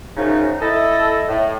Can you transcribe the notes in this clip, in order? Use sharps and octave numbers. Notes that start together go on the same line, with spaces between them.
F#2 C#3 F3 D#4
E4 A4 D#5
A2